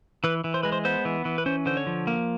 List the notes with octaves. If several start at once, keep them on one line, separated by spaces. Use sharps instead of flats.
E3 B4
E3
C5
G#3 B4
C5
B3 C5
E3
E3
B4
C#4 C5
D3 C5
C#5
F3
A#3